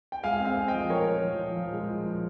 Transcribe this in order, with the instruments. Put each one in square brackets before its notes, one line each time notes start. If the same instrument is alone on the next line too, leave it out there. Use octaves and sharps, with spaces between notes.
[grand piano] G5
[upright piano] G#3 [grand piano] F5 G#5
[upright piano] C4
[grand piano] F5 G#5
[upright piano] C4
[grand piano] D#5 G5
[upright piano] F3
[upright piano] F3 [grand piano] A#4 C#5
[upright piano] F3
F3
F3
F3
G#3
F3
F3